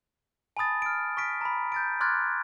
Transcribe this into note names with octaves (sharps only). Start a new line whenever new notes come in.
G#5 A5 B5 D#6 A6
F6 D7
C#6 F6 B6 D7
A#5 B5
G6 A6 D7
C6 D6 F6 F#6 G#6 A6